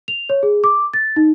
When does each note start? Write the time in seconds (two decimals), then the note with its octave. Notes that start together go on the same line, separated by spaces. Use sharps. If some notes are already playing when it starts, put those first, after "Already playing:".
0.08 F7
0.29 C#5
0.43 G#4
0.64 D6
0.94 A6
1.16 D#4